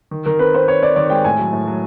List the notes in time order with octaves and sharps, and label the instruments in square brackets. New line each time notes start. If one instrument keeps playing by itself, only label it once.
[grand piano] D#3
[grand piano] D#3 [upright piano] A#4
[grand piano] C4 [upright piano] B4
[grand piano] C4 [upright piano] C5
[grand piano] C4 [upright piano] C#5
[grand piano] C4 [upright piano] D5
[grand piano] D#3 [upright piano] D5
[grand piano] G#3 [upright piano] G5
[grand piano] A2 [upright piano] G#5
[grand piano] F#3
A2
F#3